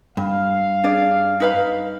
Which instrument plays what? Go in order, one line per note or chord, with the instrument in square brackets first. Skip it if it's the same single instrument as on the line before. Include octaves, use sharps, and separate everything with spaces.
[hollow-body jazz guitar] G2 [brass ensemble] F5
[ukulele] D4 G#4 D5
D#4 B4 F5